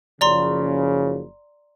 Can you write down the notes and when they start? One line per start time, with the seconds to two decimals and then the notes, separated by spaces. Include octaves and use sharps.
0.21 F#1 C#3 F3 D5 A#5 C6